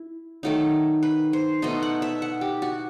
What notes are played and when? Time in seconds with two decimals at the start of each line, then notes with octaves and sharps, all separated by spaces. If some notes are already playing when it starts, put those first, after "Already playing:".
Already playing: E4
0.43 D#3 F#3 A3 D#4
1.03 B4
1.33 C5
1.62 B2 A3 D#4 D#5
1.82 F#5
2.02 E5
2.22 F#5
2.41 G4
2.62 F#4